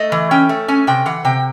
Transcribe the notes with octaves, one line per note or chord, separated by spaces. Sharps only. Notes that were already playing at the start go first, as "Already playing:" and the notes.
Already playing: A3 D#5
E3
C#4 G5
A3
C#4 G#5
C3 G5
E3 F#5
C3 G5